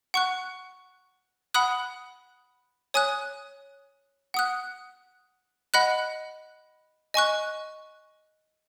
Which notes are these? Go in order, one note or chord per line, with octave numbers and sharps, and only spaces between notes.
F#5 C#6 F#6
F#5 B5 D#6 F#6
C#5 G#5 D#6 F#6
F#5 D#6 F#6
D#5 F#5 B5 F#6
D#5 G#5 C#6 F#6